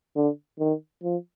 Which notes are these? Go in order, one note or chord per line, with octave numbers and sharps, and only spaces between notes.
D3
D#3
F3